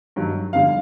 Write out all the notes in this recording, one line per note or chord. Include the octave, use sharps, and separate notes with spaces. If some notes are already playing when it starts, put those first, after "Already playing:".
G2 D#3 F#3
F2 D3 G3 F5